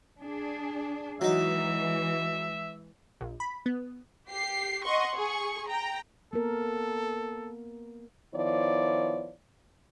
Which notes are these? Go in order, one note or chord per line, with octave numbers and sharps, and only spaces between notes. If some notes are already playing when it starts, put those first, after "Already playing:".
D4 G#4
E3 F#3 G#3 D#4 E5
A#1
B5
B3
G4 C7
D#5 F#5 C6 C#6
G#4 C#6
G5 A#5
A#3 B3 A4 A#4
D#3 F3 B3 E4 C#5 D5